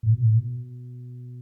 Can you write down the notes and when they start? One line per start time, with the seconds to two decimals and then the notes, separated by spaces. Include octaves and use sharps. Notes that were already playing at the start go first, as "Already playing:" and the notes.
0.03 A2
0.12 B2
0.21 A2
0.37 B2